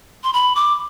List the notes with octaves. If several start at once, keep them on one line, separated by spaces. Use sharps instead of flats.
C6
B5
D6